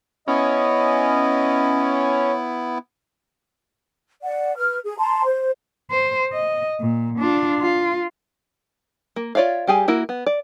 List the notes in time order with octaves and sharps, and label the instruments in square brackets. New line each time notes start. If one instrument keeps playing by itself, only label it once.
[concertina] B3 E4 [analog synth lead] C#4 [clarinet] D#5
[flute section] D5 F#5
B4 F6
G#4
A5 A#5 C6
C5
[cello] C5
D#5
A#2
D4 F4
F4
[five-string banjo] A#3
F4 C#5 D5 E5 F5
G3 G4 G#4 G#5
A#3 E4 F#4
B3
D5